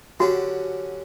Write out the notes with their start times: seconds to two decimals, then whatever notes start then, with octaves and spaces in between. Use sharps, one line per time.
0.20 D3 F#3 C#4 F#4 G4